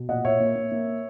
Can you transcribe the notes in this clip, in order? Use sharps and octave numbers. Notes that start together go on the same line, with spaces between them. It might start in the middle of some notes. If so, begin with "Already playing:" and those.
Already playing: B2
A#2 D#5 F#5
A#2 C#5 E5
A#3
A#3
A#3